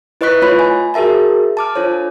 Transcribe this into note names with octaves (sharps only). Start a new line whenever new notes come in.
E4 B4 D#5 C#6 F#6 B6
A3 F4 C#5 D#5 B5 C6
G#5
F#4 G#4 A#4 E5 A5
A5 D6 F6
D4 F4 A4 C5 C#5